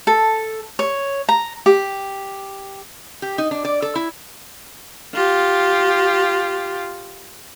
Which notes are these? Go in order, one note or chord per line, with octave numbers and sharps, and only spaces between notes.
A4
C#5
A#5
G4
G4
D#4
D4
D5
A4
E4
F4 G4